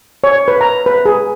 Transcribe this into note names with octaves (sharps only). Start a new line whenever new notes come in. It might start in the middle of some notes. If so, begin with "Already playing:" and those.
C#5
B4
A#5
B4
G#4